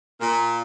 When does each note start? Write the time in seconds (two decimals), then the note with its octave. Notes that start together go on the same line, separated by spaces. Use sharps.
0.21 A#2